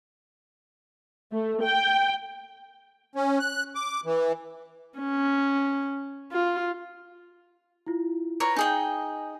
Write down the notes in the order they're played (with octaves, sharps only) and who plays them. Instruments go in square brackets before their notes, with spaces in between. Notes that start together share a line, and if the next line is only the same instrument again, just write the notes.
[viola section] A3
G5
[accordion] C#4
F#6
D6
E3
[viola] C#4
F4
[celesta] E4 F4
[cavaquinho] A#4 B4 C#5 [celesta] A#5 A#6
[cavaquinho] D#4 G#4 G5 [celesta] G#5